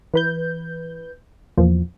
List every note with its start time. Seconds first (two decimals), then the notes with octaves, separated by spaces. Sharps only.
0.14 E3 B4 G6
1.57 E2 A#2 F3